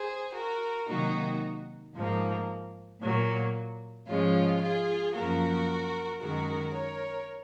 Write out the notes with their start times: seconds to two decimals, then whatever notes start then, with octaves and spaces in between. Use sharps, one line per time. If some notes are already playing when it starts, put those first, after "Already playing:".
Already playing: G#4 C5
0.34 F#4 A#4
0.87 C3 D#3 F#3 A#3 D#4 F#4
1.94 G#2 F3 A#3
3.01 A#2 F#3 A#3
4.07 G#2 F3 G#3 C#4 F4
4.60 F4 G#4
5.13 F#2 F3 A#3 F#4 A#4
6.20 F#2 D#3 G#3 F#4 A#4
6.74 A#4 C#5